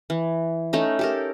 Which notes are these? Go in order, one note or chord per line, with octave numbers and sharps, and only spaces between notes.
E3
A3 C#4 D#4
G4 A4 A#4